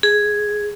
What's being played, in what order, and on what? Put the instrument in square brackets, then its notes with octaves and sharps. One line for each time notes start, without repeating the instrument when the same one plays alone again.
[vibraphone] G#4